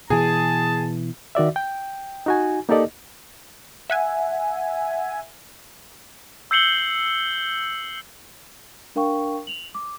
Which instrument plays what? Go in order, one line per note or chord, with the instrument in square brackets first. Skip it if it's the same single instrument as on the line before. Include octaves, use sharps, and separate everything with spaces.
[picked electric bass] B2 E3 [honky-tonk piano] G#4 [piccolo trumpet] A5
[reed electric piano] D#3 F#4 D5 E5
G5
D#4 F#4 G#5
A#3 D#4 G4 A4 D5 D#5
[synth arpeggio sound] E5 F#5 G#5
[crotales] E6 G6 C7 C#7 F#7 G7
[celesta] D4 A#4 F5 G5 C#6
F7 F#7
D6